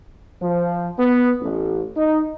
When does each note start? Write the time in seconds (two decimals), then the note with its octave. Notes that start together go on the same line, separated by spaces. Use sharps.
0.42 F3
0.99 B3
1.41 A1
1.97 D#4